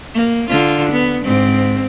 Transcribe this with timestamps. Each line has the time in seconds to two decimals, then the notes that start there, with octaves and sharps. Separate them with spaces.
0.14 A#3
0.49 D3 F4
0.91 B3
1.24 G#2 C4